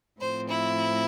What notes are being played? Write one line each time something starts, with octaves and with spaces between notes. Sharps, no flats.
A2 F3 C4 C5
E4